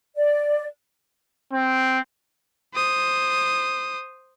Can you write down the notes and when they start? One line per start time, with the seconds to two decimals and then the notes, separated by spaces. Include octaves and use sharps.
0.16 D5
1.53 C4
2.74 C5 D#6